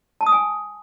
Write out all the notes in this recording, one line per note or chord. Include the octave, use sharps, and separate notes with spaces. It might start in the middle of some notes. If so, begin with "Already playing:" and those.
A5
D#6
G#5